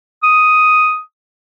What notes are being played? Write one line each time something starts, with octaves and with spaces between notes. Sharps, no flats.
D#6